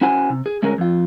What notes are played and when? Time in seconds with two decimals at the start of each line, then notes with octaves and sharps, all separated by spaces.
0.01 C#4 E4 F#4 C5 G#5
0.30 C3
0.46 G#4
0.63 D2 G#3 C#4 G#4 A#4
0.78 F2 F4